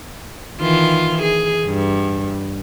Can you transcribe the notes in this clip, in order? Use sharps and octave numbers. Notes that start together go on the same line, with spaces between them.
D#3 E3 F4
G#4
G2